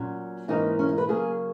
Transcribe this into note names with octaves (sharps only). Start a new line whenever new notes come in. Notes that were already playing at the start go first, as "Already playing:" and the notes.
Already playing: A#2 F#3 C#4
G#2 E3 A#3 C#4 D#4
C#4
D#4
B4
C#3 F#3 A#3 G#4